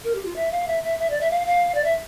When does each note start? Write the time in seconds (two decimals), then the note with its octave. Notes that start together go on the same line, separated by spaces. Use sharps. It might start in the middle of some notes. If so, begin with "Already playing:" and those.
0.04 A#4
0.15 G4
0.25 F4
0.36 E5
0.52 F5
0.67 E5
0.84 E5
0.99 E5
1.10 D5
1.21 E5
1.31 F5
1.47 F5
1.74 D5
1.84 E5